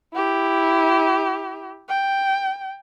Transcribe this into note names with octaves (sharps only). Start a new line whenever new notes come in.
E4 G4
G5